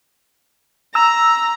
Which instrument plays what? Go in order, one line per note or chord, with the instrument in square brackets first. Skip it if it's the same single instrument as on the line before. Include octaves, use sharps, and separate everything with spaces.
[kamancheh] A#5 [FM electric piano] E6